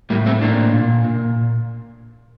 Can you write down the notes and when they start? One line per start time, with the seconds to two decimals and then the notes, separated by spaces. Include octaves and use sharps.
0.10 A2 G3 A#3
0.26 A3 C4
0.41 A2 A#3 D4
0.73 A#2
1.05 A#2